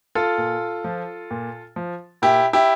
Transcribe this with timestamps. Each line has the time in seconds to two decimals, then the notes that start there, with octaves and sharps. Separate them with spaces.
0.15 F4 A4
0.38 A#2
0.84 F3
1.31 A#2
1.76 F3
2.22 A#2 E4 G4
2.53 E4 G4